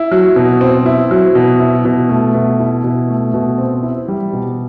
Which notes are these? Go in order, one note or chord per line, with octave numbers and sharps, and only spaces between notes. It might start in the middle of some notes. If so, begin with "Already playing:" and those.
Already playing: E4
F#3
B2
C4
E4
F#3
B2
E4
B2
A3
B2
E4
B2
A3
B2
C4
E4
G3
B2